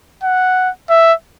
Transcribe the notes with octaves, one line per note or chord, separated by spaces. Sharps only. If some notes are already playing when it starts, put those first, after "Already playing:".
F#5
E5